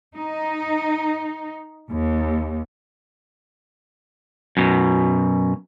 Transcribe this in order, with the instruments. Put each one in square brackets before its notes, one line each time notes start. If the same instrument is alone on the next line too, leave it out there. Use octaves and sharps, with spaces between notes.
[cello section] D#4
D#2
[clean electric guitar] F#2 B2